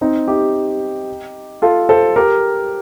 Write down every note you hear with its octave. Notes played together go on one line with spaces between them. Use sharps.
C4 D#4
D#4 G4
F4 A4
A4 C5
G4 A#4